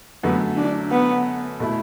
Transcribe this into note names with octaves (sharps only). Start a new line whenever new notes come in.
F#2 D3 A3 B3
D4
B3
B2 A3 E4